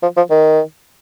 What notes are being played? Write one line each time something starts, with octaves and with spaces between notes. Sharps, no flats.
F3
F3
D#3